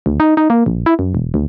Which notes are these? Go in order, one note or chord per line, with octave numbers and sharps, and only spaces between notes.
D2
D#4
D#4
A#3
A#1
E4
F#2
E1
D2